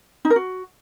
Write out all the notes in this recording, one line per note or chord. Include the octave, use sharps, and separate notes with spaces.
D#4
A#4
F#4